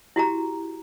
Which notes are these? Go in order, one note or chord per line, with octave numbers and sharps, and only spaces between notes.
E4 F#4 G4 A#5